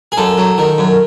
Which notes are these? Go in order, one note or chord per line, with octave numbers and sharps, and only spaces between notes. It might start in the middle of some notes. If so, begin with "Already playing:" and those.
G#4
F#2 A4
F#3
D#3
F#2